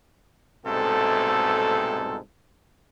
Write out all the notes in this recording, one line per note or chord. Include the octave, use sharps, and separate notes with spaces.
C2 G#2 B2 A3 C4 A4